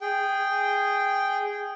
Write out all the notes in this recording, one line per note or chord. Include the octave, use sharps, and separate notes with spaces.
G#4 G5